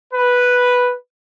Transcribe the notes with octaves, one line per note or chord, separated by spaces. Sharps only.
B4